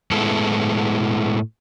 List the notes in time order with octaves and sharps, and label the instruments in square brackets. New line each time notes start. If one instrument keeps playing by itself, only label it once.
[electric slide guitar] A2 G#3 B3 E4 A4